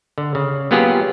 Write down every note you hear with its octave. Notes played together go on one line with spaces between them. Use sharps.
D3
C#3
F#3 A#3 B3 F4 G4 G#4